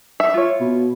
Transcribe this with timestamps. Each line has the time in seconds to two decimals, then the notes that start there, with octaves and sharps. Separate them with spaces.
0.20 E5
0.34 F4 C#5
0.60 B2